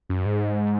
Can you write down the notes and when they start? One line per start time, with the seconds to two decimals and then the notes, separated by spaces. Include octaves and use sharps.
0.09 F#2
0.26 G#2